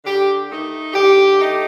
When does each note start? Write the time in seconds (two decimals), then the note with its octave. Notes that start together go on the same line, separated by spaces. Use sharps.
0.04 D3 G4
0.50 A3 D#4
0.94 D3 G4
1.39 A3 D#4